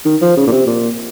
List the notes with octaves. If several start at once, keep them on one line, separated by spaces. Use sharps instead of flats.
D#3
F3
C#3
A#2
C3
A#2